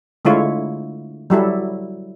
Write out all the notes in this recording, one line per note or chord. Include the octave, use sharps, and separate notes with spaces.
D3 G#3 A3 E4 F4 C#5
F#3 G3 E4 A4